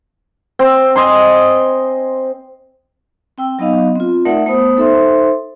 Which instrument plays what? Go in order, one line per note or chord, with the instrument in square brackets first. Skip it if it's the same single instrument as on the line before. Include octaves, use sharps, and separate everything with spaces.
[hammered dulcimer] C4
D#5 G#5 C6
[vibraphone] C4 G5 E6
F#3 B3 D#4 D#5 F5
C4 F4
A3 D#4 A#4 D5 E5 F#5
A3 B3 C5 D#6
D#4 A4 C5 E5 C6